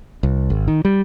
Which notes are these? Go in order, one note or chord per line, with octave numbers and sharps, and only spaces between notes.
C2
G#1
D#3
G3